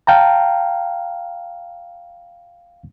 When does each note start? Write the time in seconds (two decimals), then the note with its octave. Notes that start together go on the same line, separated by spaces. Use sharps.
0.07 F5 G5 A5 A#5